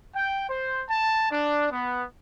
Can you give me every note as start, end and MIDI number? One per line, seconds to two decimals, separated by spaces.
0.15 0.46 79
0.48 0.83 72
0.89 1.29 81
1.30 1.68 62
1.70 2.04 59